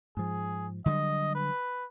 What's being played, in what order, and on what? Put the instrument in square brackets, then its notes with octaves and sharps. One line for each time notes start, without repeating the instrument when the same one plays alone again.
[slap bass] G#2 F3 [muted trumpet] G#4
[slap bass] D3 F#3 G3 [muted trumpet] D#5
[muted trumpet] B4